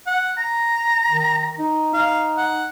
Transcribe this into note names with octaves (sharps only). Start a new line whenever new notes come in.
F#5
A#5
D#3
D#4
D#4 F5
F#5